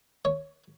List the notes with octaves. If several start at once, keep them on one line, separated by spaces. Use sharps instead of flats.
C#5